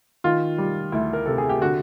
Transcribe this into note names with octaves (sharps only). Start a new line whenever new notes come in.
D#3 F4
G3
D2 E4
A#4
C3 A4
G#4
G4
D3 F#4